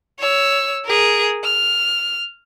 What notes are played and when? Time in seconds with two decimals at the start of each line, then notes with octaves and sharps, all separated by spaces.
0.19 C#5 E6
0.85 G#4 A#4
1.44 F6